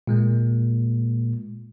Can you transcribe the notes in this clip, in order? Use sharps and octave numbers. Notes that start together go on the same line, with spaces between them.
A#2 G#3 A#3